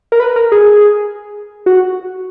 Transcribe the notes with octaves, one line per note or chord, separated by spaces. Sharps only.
A#4
B4
A#4
G#4
F#4